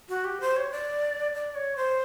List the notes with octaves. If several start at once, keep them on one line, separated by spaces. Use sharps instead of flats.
F#4
G4
C5
C#5
D5
D5
C#5
C5